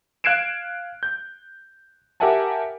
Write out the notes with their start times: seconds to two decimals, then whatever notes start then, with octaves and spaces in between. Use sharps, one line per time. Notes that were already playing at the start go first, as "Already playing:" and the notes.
0.24 F5 F#6 G#6 C7 D7 E7
1.03 G6
2.20 G4 A#4 E5 F#5 G#5 A5